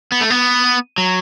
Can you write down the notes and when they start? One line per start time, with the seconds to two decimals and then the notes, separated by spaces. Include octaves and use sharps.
0.12 B3
0.21 A3
0.30 B3
0.98 F#3